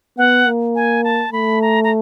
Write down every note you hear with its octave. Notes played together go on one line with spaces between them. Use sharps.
B3 F#5
A#3
G#5
A5
A3 B5
A#5
A#5